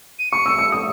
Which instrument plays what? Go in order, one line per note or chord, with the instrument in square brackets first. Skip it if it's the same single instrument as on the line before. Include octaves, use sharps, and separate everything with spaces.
[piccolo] D#7
[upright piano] C#6 [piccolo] C#7
[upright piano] E6
E6
D#6